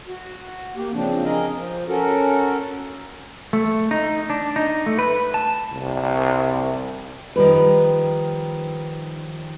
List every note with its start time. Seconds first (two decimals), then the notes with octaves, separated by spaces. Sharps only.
0.07 F#4
0.76 A#3 G4
0.93 C#3 F3 C4 D4
1.24 G#4 A#4 D#5
1.56 F3
1.88 C#4 F#4 A4 A#4
3.53 A3
3.91 D#4
4.30 D4
4.56 D#4
4.86 A3
4.99 B4
5.34 A5
5.72 C2
7.36 D#3 F3 G3 B4